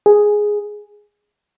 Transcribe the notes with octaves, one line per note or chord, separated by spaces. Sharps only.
G#4